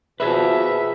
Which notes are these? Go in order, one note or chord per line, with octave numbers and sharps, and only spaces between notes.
B2 F3 G#4 B4 E5